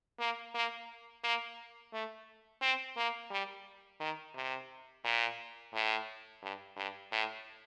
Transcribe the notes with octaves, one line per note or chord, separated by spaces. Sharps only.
A#3
A#3
A#3
A3
C4
A#3
G3
D#3
C3
A#2
A2
G2
G2
A2